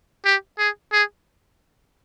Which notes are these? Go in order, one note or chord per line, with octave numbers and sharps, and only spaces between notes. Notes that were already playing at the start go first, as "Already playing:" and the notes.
G4
G#4
G#4